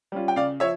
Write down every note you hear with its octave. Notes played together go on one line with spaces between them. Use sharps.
G3 C#4 F4
G5
C#3 D5 F5
F3 C#5 E5